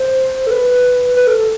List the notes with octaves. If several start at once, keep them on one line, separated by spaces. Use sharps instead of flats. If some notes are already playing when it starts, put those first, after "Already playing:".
Already playing: C5
A4
B4
B4
A4
A4